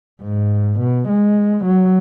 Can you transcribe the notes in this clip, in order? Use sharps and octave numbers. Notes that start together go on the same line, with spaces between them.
G#2
B2
G#3
F#3